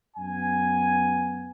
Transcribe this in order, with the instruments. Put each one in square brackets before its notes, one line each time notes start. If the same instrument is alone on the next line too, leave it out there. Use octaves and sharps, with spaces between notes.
[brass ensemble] F#2 B3 G#5